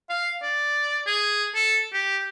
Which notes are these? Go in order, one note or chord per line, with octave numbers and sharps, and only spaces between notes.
F5
D5
G#4
A4
G4